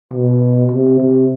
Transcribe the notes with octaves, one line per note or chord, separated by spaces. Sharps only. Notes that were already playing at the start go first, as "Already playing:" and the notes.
B2
C3
C3